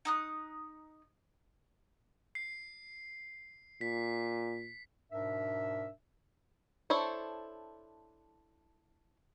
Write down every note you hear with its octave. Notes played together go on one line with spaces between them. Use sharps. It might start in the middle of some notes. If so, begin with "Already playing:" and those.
D#4 D#6 F#6
C7
A#2 B6
G#2 B2 D4 A#4 E5
D4 E4 A4 C5 C#5